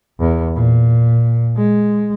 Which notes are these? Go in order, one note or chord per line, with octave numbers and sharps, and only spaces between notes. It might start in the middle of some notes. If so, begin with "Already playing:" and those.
E2
A#2
G#3